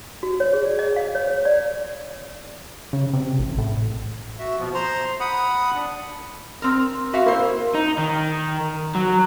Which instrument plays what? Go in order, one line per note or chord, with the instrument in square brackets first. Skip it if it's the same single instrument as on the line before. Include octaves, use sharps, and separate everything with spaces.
[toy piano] F#4
C#5
G#4
D5
D#5
F5
C#5
C#5
D5
[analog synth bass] C#3
C3
A1
A2
[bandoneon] F#4 E5
B2 F3
C5 A#5 C6
F#5 B5 D#6
D4
[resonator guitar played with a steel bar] C4 A#4
F#4 E5 F5
[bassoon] A#3 [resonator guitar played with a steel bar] E4 C5
[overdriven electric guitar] D#4
D#3
F#3